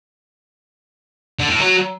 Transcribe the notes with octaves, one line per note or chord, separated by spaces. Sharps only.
D3
A2
F#3